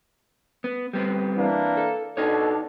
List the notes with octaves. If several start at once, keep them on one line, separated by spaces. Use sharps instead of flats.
B3
G3 B3 C4
E3 A#3 D4
A4
B2 D4 D#4 A4 C#5